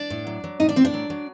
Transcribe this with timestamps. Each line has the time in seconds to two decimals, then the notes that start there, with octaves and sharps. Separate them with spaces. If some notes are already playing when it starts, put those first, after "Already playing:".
Already playing: D4 D5
0.10 A2
0.27 F#3
0.44 F#3
0.60 A2 D#4 D#5
0.69 D4 D5
0.76 A2 C4 C5
0.85 D4 D5
0.94 F#3
1.10 F#3